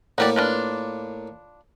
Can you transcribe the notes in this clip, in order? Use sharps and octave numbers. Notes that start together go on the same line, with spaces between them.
A2 A#3 F#4 G4 D5
D4 F4 B4